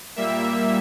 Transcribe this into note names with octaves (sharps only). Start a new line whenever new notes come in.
A#2 G3 A#3 E5